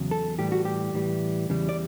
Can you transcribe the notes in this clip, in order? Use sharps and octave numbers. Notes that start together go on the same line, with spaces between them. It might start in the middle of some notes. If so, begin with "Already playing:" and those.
Already playing: E2 C#3 F#3
A4
A2 E3 G3 G4
F#4
G4
A2 E3 G3
E2 C#3 E3 G3
D5